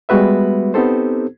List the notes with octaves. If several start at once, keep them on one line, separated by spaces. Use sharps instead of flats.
G3 G#3 B3 F#4 B4 E5
B3 C4 D#4 G4 A4 C5